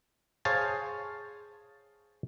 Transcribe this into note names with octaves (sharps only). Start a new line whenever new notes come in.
G#4 C5 C#5 F5 G#5 A5